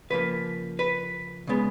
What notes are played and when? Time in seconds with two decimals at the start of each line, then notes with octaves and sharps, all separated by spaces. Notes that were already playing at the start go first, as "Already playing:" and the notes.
0.10 C#3 F3 A#3 B4
0.79 B4
1.47 C#3 G#3 B3